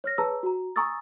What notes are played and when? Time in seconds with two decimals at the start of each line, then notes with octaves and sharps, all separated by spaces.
0.04 C#5 F6 A#6
0.18 G#4 B4 C#5 A5 A#5 E6
0.43 F#4 A#5
0.76 G#5 A#5 C#6 D#6 E6 A6